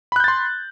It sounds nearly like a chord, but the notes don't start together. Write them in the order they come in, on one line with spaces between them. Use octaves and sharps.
B5 F#6 G6 A6 C6